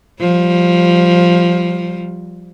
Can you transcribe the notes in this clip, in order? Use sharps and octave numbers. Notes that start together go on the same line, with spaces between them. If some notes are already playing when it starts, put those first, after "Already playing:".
F3 G3